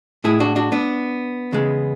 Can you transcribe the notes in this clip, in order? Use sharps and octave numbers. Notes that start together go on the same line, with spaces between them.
A2 G#3 E4 G#4
D4 F#4
D4 F#4
B3 D4
E2 C#3 G#3